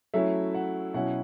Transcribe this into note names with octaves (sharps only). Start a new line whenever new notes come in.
F#3 A3 C#4 E4 E5
F#5
B2 F#3 C#4 E4 F#5